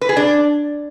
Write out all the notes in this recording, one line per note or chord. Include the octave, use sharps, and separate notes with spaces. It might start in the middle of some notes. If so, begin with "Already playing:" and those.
B4
G#4
D4